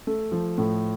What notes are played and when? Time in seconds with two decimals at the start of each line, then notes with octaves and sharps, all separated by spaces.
0.07 A3
0.32 F3
0.58 A2